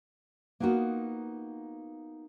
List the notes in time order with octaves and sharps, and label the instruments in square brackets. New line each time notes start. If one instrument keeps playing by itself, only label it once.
[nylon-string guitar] A#3 B3 D#4 F4 F#4